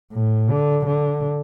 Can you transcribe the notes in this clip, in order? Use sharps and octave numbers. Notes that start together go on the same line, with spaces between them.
A2
D3
D3